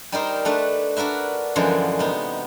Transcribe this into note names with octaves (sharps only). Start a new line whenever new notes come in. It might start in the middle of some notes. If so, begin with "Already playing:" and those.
G3 D#4 A#4 C5
A3 D4 B4
D4 F#4 A#4 B4 E5
F#2 D3 E3 F3 G#3 F#4
C3 B3 D#4